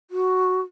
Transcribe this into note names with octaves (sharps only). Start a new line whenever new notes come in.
F#4